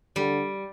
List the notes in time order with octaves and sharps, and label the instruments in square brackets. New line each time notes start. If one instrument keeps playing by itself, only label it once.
[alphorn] D3 [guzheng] G3